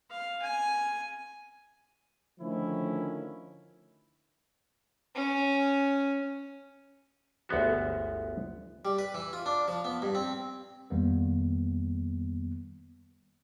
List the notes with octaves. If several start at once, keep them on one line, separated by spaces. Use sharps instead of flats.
F5
G#5
D3 D#3 F3 A3 C#4 E4
C#4
G1 D2 G#3 B3 F#4
G3
B4
E3
F4
D4
F3
B3
G2
C4
F2 D#3 G3 A#3 B3